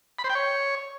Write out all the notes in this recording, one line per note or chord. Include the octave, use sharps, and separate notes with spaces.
B5
C5
G5
C#5